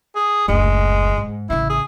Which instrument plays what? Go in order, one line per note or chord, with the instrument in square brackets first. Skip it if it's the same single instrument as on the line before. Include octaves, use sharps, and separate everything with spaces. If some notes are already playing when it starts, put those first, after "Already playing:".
[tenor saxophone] G#4
[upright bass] F#1 D2 [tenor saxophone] G#3
[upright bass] G#2
[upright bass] A1 C#3 [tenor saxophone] E4
[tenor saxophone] G#4